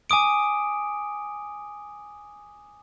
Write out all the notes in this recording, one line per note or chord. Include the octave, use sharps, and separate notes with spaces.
G#5 D6 D#6 D7